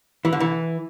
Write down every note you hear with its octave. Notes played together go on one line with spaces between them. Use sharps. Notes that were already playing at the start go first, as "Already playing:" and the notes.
E3
D3
E3